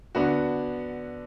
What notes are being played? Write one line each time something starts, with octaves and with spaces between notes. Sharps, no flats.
D3 B3 D4 F#4